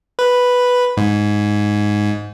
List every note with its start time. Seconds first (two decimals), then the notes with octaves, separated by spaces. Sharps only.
0.19 B4
0.97 G#2